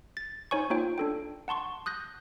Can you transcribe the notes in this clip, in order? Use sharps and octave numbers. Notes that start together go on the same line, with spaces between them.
A6
D#4 C5 C#5 G#5 C#6
A#3 D#4 F4 C5 C#5 G5
D4 A4 G5
F#5 A5 C6 C#6
D#6 F#6 G6 A#6